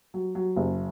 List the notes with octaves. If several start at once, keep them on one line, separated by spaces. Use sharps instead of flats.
F#3
F#3
F#1